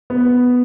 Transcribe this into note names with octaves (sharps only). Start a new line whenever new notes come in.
B3